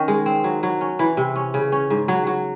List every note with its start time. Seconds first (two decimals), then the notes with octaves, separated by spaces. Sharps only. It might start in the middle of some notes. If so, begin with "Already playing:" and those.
Already playing: D#3 C#4
0.08 G#3
0.26 C4
0.44 F#3
0.63 F#3
0.81 C#4
0.99 E3
1.17 C3
1.36 C#4
1.54 C#3
1.72 C#4
1.90 G#2
2.08 F#3
2.27 F#3